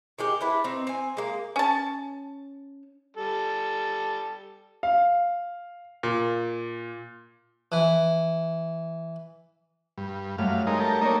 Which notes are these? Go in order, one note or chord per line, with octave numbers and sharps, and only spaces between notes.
D#3 G#3 G4
D4 E4 B4
C4 D#4
C4 G#5
G#3 A#3
C#4 A5
G3 A4
F5
A#2
E3
G2
F#2 F#3 G3 A3 F5
G#3 D#4 A#4
G4 A4 A#4
A#3 D#4 A#4 C#5 D5 A5